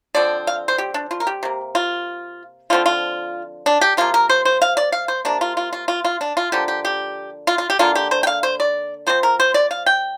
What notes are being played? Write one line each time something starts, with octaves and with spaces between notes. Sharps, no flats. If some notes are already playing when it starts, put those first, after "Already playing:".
D3 F3 C4 D5
F5
C5
G4
D4
F4
A#4
G4
C3 A#3
F4
D3 F3 C4 F4
F4
D4
G4
C3 F3 A#3 F4
A#4
C5
C5
F5
D5
F5
C5
C3 A#3 D4
F4
F4
F4
F4
F4
D4
F4
D3 F3 A#3 G4
G4
G4
F4
F4
G4
D3 A#3 F4
G4
C5
G5
F5
C5
D5
F3 C4 C5
A#4
C5
D5
F5
G5